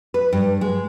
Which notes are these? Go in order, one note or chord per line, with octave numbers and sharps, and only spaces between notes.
B4
G2
G#3